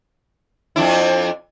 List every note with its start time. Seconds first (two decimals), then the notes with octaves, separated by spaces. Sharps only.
0.76 F2 D4 E4